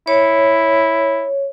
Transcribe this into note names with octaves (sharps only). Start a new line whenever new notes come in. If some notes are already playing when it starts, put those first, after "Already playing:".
E4 C#5